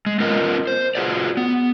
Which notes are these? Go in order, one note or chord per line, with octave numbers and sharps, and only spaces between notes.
G#3
B3 C#4 F4 A#4 B4 D#5
C5
F4 F#4 G#4 B4 D5
B3